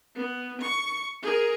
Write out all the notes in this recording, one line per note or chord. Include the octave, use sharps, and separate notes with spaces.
B3
C#6
G#4 A#4